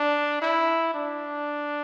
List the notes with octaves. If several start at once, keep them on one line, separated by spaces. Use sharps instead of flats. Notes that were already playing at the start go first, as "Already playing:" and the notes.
Already playing: D4
E4
D4